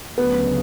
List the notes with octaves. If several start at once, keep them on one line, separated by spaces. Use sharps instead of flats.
D2 C#3 F#3 B3